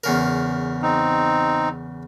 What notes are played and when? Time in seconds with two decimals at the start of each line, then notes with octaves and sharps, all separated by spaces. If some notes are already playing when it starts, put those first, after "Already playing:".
0.04 E2 C#3 A#4
0.82 C4 D#4